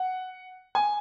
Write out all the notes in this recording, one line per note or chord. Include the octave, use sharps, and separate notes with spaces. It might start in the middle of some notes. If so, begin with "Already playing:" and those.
Already playing: F#5
G#5